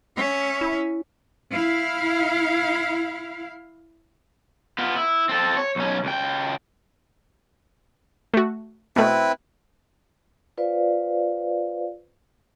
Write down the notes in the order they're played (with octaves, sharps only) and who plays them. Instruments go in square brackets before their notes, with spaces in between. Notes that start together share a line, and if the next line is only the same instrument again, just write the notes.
[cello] C#4 E5
[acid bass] E4
[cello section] E4 F5
[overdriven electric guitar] B3 F4
E4
C4 A4
C#5
B1 C#4
C#2 G5
[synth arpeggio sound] A3 F#4
[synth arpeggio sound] B2 A3 [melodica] C4 E4 B4
[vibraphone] F4 B4 C5 D5 F5